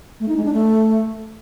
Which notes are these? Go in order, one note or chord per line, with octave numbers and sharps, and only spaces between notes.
A3
D#4
G#3
D4
A3